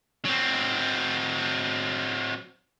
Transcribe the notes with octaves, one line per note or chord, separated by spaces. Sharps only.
F#3 C4